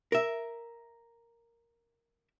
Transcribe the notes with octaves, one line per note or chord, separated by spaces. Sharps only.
A#4 E5